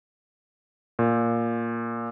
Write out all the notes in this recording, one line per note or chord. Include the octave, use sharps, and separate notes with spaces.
A#2